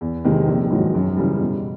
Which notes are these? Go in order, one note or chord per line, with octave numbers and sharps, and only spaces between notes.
E2
C3 D#3 G#3
A#1
G#2 D#3 F#3
F#2
C#3 E3 G3
B2